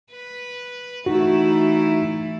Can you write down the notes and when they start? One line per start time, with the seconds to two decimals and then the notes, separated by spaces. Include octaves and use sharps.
0.11 B4
1.06 E3 A3 D#4 E4 F#4